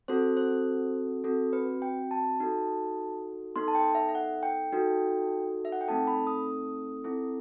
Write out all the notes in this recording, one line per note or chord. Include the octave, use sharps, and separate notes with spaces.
C4 F#4 A4 C5
C5
C4 F#4 A4
B4
G5
A5
D#4 F#4 A4
B3 D#4 A4 C6
A5
G5
E5
E5
F#5
G5
D#4 F#4 A4
E5
F#5
G5
A3 C4 D#4 A4 A5
B5
D#6
C4 E4 A4